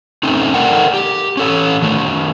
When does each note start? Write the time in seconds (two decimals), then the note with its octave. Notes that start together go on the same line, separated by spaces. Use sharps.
0.23 A3 C4 C#4 D#4
0.54 A4 A#4 D5 F#5 G5
0.94 G4
1.37 C#4 A4 C#5
1.82 D#3 A3